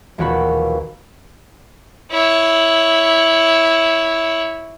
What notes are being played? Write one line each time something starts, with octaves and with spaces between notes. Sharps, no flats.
E1 A#1 D#2 F#4 B5
E4 C#5